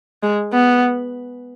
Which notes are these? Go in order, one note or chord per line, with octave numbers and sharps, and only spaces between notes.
G#3
B3